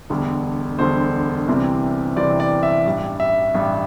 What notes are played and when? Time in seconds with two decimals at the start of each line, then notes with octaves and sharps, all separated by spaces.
0.10 E1 D2 D3 G3
0.79 E1 D2 D3 G3 C5
1.48 C2 C3 E3 G3 C4
2.16 C2 C3 E3 G3 C4 D5
2.40 D5
2.63 E5
2.85 A1 G2 G3
3.20 E5
3.55 A1 G2 G3